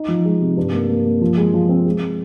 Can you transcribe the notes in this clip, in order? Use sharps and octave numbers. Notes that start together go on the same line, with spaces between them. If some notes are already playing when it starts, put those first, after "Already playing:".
Already playing: D#4
F3
G#3
C3
G2
A#3
A#3
A#3
F3
G#3
F3
C4
G#3